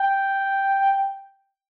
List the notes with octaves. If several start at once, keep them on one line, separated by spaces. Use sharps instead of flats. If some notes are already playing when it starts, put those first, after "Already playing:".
Already playing: G5